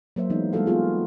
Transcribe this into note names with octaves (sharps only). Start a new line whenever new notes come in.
F#3 A#3 C5 E5
E3 G#3 B3 D#4
G3 G#3 A#3 F#4 A4 F5
A#3 B3 F4 G#4